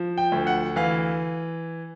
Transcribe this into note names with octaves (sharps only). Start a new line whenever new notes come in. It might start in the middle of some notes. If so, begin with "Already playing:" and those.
Already playing: F3
G5
D2
F#5
E3 F5